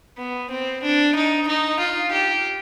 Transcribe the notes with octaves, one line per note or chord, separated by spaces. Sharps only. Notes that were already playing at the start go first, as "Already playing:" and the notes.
B3
C4
D4
D#4
D#4
F4
G4